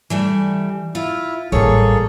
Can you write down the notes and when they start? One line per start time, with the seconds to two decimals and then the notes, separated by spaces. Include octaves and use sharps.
0.10 E3 G3 A3
0.95 E4 F4
1.52 A1 G3 A#3 G#4 A4 C#5